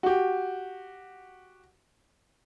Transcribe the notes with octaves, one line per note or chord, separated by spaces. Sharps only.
F#4 G4